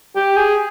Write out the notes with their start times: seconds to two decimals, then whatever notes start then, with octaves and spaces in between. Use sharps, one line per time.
0.16 G4
0.37 G#4